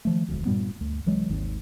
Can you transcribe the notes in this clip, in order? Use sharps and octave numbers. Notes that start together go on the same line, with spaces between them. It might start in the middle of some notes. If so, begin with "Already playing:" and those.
D#3 F3 A3
E1 D2
G2 A#2 G3 B3
D2
C2 E3 F#3 G#3
G#1 D#2